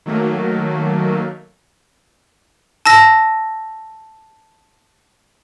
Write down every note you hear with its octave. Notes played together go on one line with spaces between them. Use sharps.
D#3 F#3 A3 A#3
A5 E6 A#6